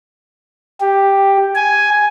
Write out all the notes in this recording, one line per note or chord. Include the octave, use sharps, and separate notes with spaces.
G4
G#5